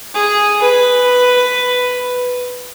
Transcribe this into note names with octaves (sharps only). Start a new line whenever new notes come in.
G#4
B4